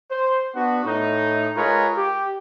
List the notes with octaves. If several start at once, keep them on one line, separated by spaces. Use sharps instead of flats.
C5
B3 D4 F#4
A2 D#4
G#3 F4 A#4 B4 C#5
G4